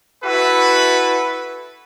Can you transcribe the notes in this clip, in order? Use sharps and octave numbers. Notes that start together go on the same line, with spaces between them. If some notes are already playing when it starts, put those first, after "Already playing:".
E4 F#4 A4 B4